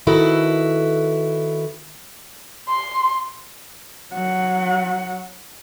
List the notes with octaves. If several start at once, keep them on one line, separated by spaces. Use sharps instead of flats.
D#3 E4 F#4 A4 B4
C6
F#3 F#5